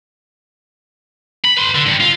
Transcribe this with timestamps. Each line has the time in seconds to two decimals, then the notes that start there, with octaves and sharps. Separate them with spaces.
1.45 B5
1.57 B4 C6
1.75 D3
1.87 G2
2.01 F4